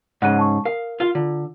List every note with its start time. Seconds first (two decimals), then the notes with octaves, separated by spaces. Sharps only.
0.22 G#2 C#3 F#5 F#6 D#7
0.38 A5 C#6
0.65 A#4 F5
1.00 F4 F5
1.15 D3 F4